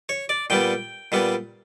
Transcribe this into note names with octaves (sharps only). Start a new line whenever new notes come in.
C#5
D5
A#2 G3 B3 G5
A#2 G3 B3